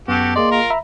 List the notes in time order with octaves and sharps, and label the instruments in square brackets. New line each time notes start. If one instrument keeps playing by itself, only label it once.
[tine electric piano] F#2 B3 [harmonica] F#4 G4 A4
[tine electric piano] A#3 G#4 D#5 [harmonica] D5 C6
[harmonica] F4 A#4
[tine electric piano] E5 A#5 B5